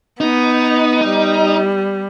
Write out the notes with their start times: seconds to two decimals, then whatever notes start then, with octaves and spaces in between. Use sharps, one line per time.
0.21 B3 D#4
1.05 G3